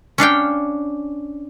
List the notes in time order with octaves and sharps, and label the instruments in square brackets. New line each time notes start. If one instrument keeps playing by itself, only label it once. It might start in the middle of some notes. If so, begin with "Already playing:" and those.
[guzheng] C#4 D4 F5 G5